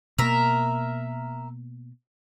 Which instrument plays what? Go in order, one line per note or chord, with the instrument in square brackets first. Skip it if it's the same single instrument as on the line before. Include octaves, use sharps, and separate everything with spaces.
[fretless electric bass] B2 A#3 [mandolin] A#4 E5